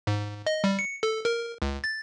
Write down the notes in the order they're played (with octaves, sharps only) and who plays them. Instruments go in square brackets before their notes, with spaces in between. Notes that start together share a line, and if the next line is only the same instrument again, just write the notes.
[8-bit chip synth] G#2
D#5
G3
C#7
A4
A#4
C#2
A6